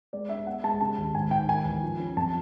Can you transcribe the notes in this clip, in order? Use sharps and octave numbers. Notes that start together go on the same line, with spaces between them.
G#3 D5
D4 E5
B3 F#5
G#3 A5
C#3 A5
D#2
G#2 G#5
G#2 G5
D#3 G#5
E2
F3
C#4
F2 A5